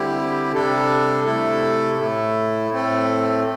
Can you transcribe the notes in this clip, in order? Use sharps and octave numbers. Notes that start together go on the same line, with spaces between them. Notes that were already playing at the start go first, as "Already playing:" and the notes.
Already playing: D3 G3 C4 E4 G4
C3 G3 D4 A4
C3 A3 E4 A4
A2 A3 E4
A2 A3 C4 A4